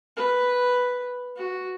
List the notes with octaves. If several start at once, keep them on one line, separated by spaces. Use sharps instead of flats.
B4
F#4